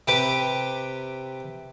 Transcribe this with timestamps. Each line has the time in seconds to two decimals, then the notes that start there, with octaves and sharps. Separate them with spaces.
0.08 C3 G4 B4 D6